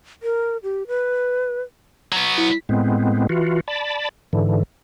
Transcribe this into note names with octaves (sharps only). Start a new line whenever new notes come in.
A#4
G4
B4
F#3 B3
E4
A2 G#3 B3 C4
E3 F4 F#4
D5 A5 B5
G#2 D3 E3